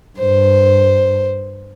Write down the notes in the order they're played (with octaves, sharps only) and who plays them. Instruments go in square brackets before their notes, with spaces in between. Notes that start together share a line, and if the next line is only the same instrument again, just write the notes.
[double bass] G2 [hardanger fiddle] C5